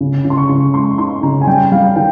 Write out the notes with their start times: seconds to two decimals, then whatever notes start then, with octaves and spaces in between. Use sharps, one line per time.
0.01 C#3
0.25 C#3
0.30 C6
0.37 C#6
0.49 C#3
0.74 G#3 C6
0.98 D#4 C6
1.23 C#3 A#5
1.41 G#5
1.47 G3 G5
1.72 G3 F5
1.96 D#3 G5